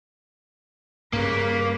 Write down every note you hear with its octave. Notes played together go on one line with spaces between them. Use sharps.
G2 C#3 A#3 B4